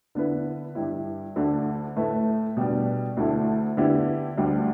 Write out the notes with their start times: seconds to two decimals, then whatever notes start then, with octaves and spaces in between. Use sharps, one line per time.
0.15 D3 B3 E4 B4
0.75 G2 G3 E4
1.36 D2 D3 A3
1.96 A2 A3 E4 B4
2.57 B2 G3 B3 D4
3.17 D2 D3 A3 E4
3.77 D3 B3 E4 G4
4.37 D2 D3 G3